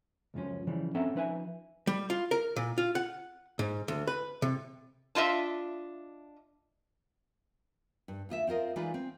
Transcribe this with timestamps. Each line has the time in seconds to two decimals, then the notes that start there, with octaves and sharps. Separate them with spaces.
0.34 C#2 F#2 F3 C#4
0.67 C#3 E3 F3 G3
0.95 C4 C#4 A4 E5 F#5 A#5
1.15 F3 D#4 B4 E5 G#5
1.87 G3
2.10 F4
2.31 A#4
2.56 A#2
2.78 F4
2.95 F#5
3.59 G#2
3.88 D2
4.07 B4
4.42 C3
5.15 D4 F4 D#5 E5
8.08 G2
8.29 D2 F4 D#5 E5
8.47 C4 F4 A#4 D#5
8.76 E3 G#3 D#4 F4 B4 D5
8.94 C4